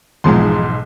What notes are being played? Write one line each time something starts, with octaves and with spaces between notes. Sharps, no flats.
B1 E2 G#2 F3 G#3 C6